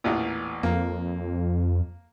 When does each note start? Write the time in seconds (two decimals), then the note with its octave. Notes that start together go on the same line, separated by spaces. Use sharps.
0.04 A1 E2 A#2
0.63 F2 A#3